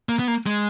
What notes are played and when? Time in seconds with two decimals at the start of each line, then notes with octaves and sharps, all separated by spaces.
0.09 A#3
0.19 B3
0.28 A#3
0.46 G#3